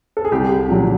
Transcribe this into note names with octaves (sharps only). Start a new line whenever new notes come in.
A4
G#4
C2 G4
A#2 F#3